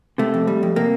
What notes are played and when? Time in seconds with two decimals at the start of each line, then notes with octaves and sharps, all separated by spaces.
0.18 C3 A3
0.34 F2
0.47 G3
0.63 F2
0.76 C3 A#3